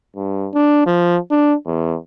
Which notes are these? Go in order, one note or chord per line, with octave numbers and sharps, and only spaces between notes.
G2
D4
F3
D4
E2